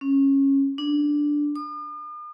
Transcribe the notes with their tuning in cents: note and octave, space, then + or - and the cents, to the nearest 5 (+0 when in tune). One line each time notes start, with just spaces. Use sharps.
C#4 -15
D4 +0
D#6 -45